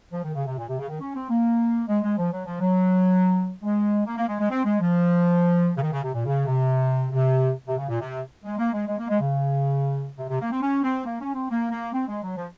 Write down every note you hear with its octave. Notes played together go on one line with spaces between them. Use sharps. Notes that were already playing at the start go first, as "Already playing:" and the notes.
F3
D#3
C#3
C3
A#2
C3
C#3
D#3
C#4
C4
A#3
G#3
G#3
F3
F#3
F3
F#3
G#3
A#3
A#3
G#3
G#3
C4
G#3
F3
C#3
D#3
C#3
C3
A#2
C#3
C3
C3
C3
C#3
A#2
C3
G#3
A#3
G#3
G#3
A#3
G#3
C#3
C3
C3
A#3
C4
C#4
C4
A#3
C#4
C4
A#3
A#3
C4
G#3
F#3
F3